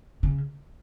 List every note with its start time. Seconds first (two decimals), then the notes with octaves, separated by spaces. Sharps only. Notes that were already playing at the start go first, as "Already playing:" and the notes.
0.23 C#3